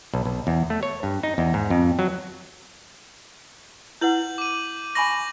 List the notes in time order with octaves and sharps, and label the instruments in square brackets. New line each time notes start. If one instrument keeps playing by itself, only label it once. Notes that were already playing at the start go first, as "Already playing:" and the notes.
[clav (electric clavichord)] B1
B1
E2
A3
C#5
G2
D#4
E2
G#2
F2
F#3
[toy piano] E4 B4 F#5 [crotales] G6 F#7
[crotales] D6 D#7
[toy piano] G#5 B5 C#6 [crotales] A#6 F#7